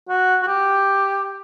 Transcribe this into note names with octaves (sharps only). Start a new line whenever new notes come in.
F#4
F#4
G4